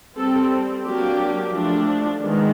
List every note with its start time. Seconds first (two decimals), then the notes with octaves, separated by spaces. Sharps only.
0.16 G3 C4 A4
0.84 F#3 A#3 D4 G4
1.52 F3 A3 D4
2.20 D#3 G#3 B3